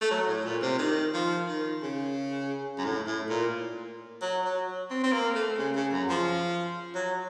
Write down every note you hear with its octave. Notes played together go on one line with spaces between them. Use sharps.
A3
F#3
A2
A#2
C3
D#3
F3
D#3
C#3
F#2
A2
A2
A#2
F#3
F#3
C4
C4
A#3
A3
C#3
C#3
F#2
F3
F#3